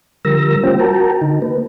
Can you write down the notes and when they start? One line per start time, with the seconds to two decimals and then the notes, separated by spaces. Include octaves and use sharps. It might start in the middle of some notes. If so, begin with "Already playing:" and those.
0.25 D3 F3 G3 A#4 E6 A#6
0.63 G3 A#3 C#4 F4 C5 G5
0.79 F#4 A#4 G5 A5 A#5
1.21 D3 D#4
1.42 A#3 B4